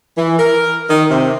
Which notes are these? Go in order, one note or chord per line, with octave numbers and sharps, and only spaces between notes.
E3
A#4
D#3
C3